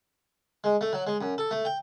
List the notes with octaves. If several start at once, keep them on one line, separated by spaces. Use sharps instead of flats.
G#3
A3
F#3
G#3
F#2
A4
A3
G5